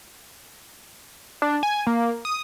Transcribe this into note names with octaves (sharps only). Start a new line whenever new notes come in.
D4
G#5
A#3
D#6